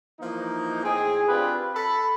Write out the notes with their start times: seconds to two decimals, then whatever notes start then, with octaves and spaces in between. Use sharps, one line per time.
0.20 E3 F3 A#3 D#4
0.83 A2 C4 G#4
1.28 C4 D4 F4 G4 B4
1.75 A4 B5